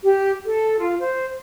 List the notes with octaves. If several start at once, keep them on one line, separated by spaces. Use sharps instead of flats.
G4
A4
F4
C5